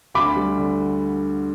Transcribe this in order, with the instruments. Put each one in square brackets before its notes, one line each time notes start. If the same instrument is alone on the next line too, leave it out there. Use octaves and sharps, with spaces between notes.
[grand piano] D2 [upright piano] B5 D6
[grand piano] G3
D3